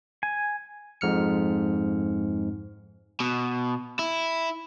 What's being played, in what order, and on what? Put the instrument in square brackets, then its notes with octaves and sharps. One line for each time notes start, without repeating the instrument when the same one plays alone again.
[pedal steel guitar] G#5
[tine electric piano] F2 G#2 F6 C#7
[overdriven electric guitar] B2
E4